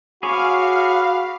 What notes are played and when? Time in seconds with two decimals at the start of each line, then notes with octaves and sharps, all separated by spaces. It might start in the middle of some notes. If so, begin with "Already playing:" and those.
0.23 F#4 G#4 C#5 F5 B5 D6